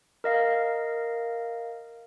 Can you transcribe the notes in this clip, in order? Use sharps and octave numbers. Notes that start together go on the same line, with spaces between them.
A#4 D#5 F5